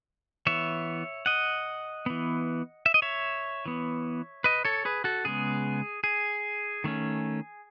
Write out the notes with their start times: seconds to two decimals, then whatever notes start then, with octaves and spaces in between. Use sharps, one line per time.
0.47 E3 B3 C#5 E5
1.26 D#5 F#5
2.06 E3 B3
2.86 E5
2.94 D#5
3.02 C#5 E5
3.66 E3 B3
4.44 B4 D#5
4.65 A4 C#5
4.85 G#4 B4
5.04 F#4 A4
5.25 C#3 G#3 B3 G#4
6.04 G#4
6.84 D#3 A3 C#4